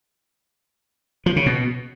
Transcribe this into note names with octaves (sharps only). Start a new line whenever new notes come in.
F3
C#3
B2